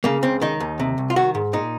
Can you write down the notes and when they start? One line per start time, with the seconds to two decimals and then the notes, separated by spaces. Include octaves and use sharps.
0.04 C#3 A#3
0.23 C#2 C4
0.41 D#3 D#4
0.60 D#2
0.80 C3
0.98 C2
1.10 F4
1.16 D#3 F#4
1.35 G#2
1.53 A#2 D#4